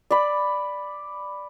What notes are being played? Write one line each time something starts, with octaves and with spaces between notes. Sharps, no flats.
D5 B5